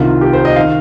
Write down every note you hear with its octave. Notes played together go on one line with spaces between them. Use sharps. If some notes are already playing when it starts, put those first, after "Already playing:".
Already playing: C2 C3 D#3 F4
G4
C5
D#5
D#3 F5